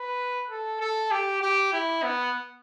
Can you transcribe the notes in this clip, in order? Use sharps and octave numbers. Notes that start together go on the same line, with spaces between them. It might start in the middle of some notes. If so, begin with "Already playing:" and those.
Already playing: B4
A4
A4
G4
G4
E4
B3